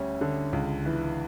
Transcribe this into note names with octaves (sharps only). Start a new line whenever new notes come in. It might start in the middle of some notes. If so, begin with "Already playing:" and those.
Already playing: D2 G3 C#4
D3
C#2
E3